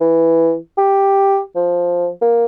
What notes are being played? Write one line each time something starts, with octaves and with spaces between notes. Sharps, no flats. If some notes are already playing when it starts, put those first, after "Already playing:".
E3
G4
F3
A#3